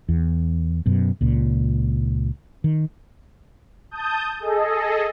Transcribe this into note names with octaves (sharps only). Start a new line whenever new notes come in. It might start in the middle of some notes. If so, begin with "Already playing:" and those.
E2
F#2 B2
C#2 A#2
D#3
A5 D#6 G6
G#4 A4 D#5